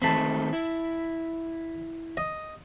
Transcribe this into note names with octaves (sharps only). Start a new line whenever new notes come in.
D#3 A3 C4 A5 B5 C6
E4
D#5